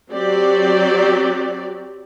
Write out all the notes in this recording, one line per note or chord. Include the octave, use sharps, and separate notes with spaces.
F#3 C4 G4 D5